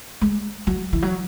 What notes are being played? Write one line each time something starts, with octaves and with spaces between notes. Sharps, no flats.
G#3
F#3
E3
F#3